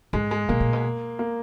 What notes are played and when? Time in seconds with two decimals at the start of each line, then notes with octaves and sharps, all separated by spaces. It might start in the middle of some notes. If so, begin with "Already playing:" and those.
0.13 G#2 G#3
0.31 G#3
0.49 B2 A#3
0.60 A#2
0.73 B2
1.19 A#3